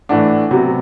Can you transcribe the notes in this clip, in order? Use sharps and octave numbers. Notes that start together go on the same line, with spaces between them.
A2 E3 A3 D4 F#5
C3 F#3 B3